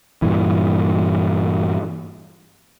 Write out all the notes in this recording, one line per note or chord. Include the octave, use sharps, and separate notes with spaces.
G2 A#2 E3